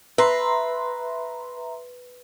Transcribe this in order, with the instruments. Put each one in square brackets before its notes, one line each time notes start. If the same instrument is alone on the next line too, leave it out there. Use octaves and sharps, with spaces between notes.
[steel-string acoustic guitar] B4 [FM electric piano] E5 A#5 C6